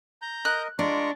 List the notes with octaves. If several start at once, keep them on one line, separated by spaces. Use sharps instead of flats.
A#5 G6
A#4 D#5 F#6
G#3 D4 F4 A#5 C#6 D6